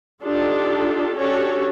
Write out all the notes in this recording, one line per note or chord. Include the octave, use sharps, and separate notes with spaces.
D4 D#4 F4 G4 A4
C#4 D4 F#4 G4 A4 C#5